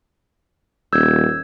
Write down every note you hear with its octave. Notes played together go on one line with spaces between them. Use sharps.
D#1 E6 G6 G#6